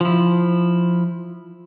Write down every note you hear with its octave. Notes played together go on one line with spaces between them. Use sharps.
F3 E4